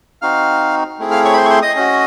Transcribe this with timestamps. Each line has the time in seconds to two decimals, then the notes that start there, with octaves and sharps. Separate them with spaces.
0.22 C4 D#4 F#4 F5 F6
0.99 A3 C4 E4 G#4
1.11 F5 F6
1.25 C#5 C#6
1.33 B5
1.37 C5 C6
1.45 C#6
1.50 C5 C6
1.62 D#5 D#6
1.75 C#4 F#4